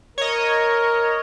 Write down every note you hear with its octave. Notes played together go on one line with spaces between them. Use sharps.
A#4 C#5 D#5